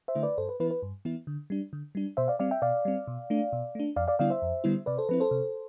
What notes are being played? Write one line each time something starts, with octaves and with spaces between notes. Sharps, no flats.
C5 E5
D3 A3 E4
B4 D5
G2 A4 C5
B4
E3 B3 E4 B4
B4
G2
E3 B3 E4
D3
G3 D4
D3
G3 D4
B2 C5 E5
D5 F5
G3 C4 D5 F5
E5 G5
B2 D5 F5
G3 C4
B2
A3 D4
B2
A3 D4
F2 D5 F5
D5 F5
D3 G3 B3 E4 D5 F5
C5 E5
F2
D3 G3 B3 E4
C3 B4 D5
A4 C5
F3 C4 E4 B4
A4 C5
C3